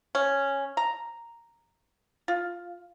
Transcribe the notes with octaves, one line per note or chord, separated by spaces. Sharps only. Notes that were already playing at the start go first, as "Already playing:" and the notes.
C#4
A#5
F4